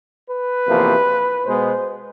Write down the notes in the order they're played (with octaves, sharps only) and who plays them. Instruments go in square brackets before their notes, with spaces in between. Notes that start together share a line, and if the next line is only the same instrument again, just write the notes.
[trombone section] B4
E2 C3 F3 A#3
B2 G#3 B3 C5